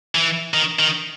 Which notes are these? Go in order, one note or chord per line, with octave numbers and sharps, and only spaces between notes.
E3
D#3
D#3